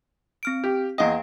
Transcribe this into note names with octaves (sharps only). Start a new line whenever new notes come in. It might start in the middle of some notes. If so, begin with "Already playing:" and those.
C4 F6 D7
G4
E2 A#3 D#5 F5 G5